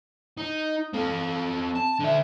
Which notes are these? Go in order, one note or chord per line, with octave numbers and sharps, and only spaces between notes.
D#4
C4 A4
A5
D3 E5